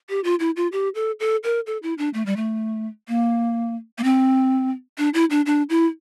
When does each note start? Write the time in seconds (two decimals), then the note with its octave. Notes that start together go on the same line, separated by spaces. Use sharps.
0.09 G4
0.24 F4
0.40 E4
0.56 F4
0.72 G4
0.95 A4
1.20 A4
1.44 A#4
1.67 A4
1.83 E4
1.98 D4
2.14 A3
2.26 G3
2.36 A3
3.08 A#3
3.98 A#3
4.04 C4
4.98 D4
5.14 E4
5.30 D4
5.46 D4
5.70 E4